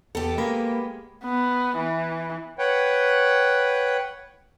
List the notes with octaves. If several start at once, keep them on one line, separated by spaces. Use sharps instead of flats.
E2 B3 G4 A4
G#3 A#3 A4 A#4 B5
B3
E3
B4 C#5 F#5 G5